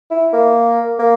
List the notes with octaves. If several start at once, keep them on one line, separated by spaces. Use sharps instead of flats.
E4
A#3
A#3